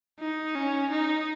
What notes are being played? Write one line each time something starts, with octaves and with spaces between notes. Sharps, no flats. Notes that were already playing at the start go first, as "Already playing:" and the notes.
D#4
C#4
D#4